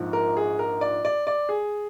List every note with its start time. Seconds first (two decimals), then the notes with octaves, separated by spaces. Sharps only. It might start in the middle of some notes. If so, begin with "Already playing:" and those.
Already playing: A#1 G#2 F3
0.13 A#4
0.37 G#4
0.59 A#4
0.81 D5
1.05 D5
1.27 D5
1.49 G#4